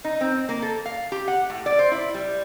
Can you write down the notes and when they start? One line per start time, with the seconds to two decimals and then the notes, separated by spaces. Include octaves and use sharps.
0.04 D#4
0.21 C4
0.49 A#3
0.62 A4
0.86 F5
1.12 G4
1.28 F#5
1.50 A2
1.66 D5
1.79 C5
1.92 E4
2.14 G3